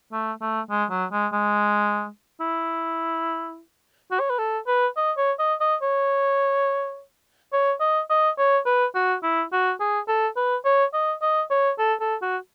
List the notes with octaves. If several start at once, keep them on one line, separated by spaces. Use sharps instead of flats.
A3
A3
G#3
F#3
G#3
G#3
E4
F#4
C#5
B4
A4
B4
D#5
C#5
D#5
D#5
C#5
C#5
D#5
D#5
C#5
B4
F#4
E4
F#4
G#4
A4
B4
C#5
D#5
D#5
C#5
A4
A4
F#4